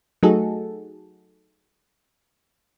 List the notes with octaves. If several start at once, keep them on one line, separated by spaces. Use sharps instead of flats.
F#3 A3 D#4 F#4 G#4 A4